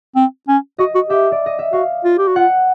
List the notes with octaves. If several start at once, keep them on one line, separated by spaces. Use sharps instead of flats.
C4
C#4
F#4 D#5
F#4
G4 E5
D5
D#5
E5
F#4 F5
F4
G4
F#4
F4 F#5